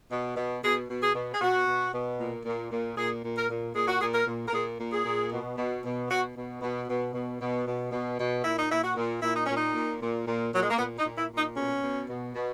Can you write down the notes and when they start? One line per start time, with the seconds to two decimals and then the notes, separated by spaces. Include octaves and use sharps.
0.10 B2
0.36 B2
0.62 B2 G#4
0.88 B2
1.02 G#4
1.14 B2
1.32 G#4
1.40 B2 F#4
1.66 B2
1.92 B2
2.18 A#2
2.45 A#2
2.70 A#2
2.96 A#2 G#4
3.23 A#2
3.35 A#4
3.49 A#2
3.74 A#2 G#4
3.87 F#4
4.00 A#2 G#4
4.14 A#4
4.27 A#2
4.48 A#4
4.53 A#2 G#4
4.79 A#2
4.92 G#4
5.05 A#2
5.31 B2
5.57 B2
5.83 B2
6.09 B2 F#4
6.35 B2
6.61 B2
6.87 B2
7.13 B2
7.40 B2
7.66 B2
7.92 B2
8.18 B2
8.43 A#2 E4
8.59 D#4
8.70 A#2 E4
8.83 F#4
8.96 A#2
9.22 A#2 E4
9.34 D#4
9.45 A#2 C#4
9.56 D#4
9.74 A#2
10.00 A#2
10.26 A#2
10.52 A#2 F#3
10.62 G#3
10.70 A#3
10.79 A#2 B3
10.98 D#4
11.04 A#2
11.18 E4
11.31 A#2
11.37 D#4
11.57 B2 C#4
11.82 B2
12.09 B2
12.35 B2